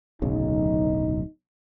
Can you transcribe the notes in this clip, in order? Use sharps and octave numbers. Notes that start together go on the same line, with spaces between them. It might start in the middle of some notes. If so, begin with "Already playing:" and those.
D1 B1 C#3 D#4